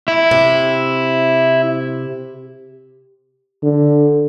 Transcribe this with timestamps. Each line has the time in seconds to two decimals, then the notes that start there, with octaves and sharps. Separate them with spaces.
0.08 E4
0.31 C3
3.63 D3